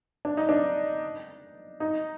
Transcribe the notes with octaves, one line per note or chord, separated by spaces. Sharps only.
D4
D#4
D4
D#4